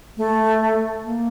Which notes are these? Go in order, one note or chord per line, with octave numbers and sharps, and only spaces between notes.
A3
A#3